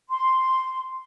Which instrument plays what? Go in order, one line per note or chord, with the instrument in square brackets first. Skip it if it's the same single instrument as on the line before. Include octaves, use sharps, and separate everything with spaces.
[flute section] C6